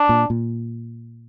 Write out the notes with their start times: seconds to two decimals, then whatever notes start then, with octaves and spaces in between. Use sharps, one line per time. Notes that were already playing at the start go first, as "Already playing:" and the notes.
Already playing: D4
0.09 A#2
0.30 A#2